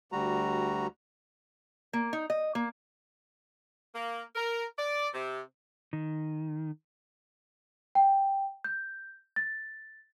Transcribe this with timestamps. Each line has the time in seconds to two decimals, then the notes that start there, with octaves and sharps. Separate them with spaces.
0.12 D2 G3 F#4 A#5
1.93 A#3
2.13 D#4
2.30 D#5
2.55 A#3
3.95 A#3
4.36 A#4
4.77 D5
5.14 C3
5.93 D#3
7.95 G5
8.64 G6
9.36 A6